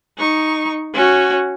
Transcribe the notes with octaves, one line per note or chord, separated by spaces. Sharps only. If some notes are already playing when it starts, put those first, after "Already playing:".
D#4 C#6
C#4 F#4